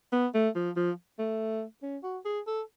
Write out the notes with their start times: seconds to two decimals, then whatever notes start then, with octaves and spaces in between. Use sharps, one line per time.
0.12 B3
0.34 A3
0.56 F3
0.77 F3
1.19 A3
1.83 C#4
2.03 F#4
2.25 G#4
2.47 A4